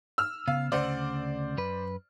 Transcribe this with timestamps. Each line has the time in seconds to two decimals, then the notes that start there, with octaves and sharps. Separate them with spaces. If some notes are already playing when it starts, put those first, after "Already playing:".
0.18 E6 F6
0.48 C#3 B3 F5
0.72 D2 C#3 C5 D5 F#5
1.57 F#2 B4